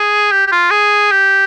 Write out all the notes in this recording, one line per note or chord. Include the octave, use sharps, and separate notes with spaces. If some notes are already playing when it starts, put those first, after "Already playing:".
Already playing: G#4
G4
G4
F4
G#4
G4